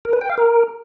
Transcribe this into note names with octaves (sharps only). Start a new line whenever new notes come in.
A#4
B4
G5
F5
A#4